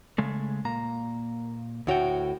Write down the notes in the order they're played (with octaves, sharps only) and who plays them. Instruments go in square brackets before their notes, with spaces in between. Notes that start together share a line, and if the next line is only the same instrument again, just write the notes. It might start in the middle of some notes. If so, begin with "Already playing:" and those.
[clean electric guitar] C#3 G#3 A3
A#2 A#3 A#5
[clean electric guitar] D2 C#5 G5 [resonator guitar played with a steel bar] A2 F#4